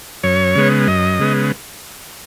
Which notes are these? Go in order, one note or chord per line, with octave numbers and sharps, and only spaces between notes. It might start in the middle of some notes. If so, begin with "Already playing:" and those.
F#2 C#5
C#3 G#3 B3
F#2 D#5
C#3 G#3 B3